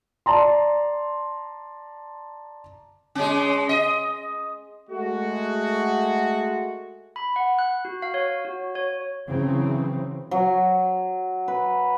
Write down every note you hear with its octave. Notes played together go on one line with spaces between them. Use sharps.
D5 A5 A#5 C6
G#3 C#4
D#5
G#3 A3 F#4
B5
F#5
F#6
F#4
F5
C#5
F#4
C#5
C#3 E3 F#3 C4
F#3
B4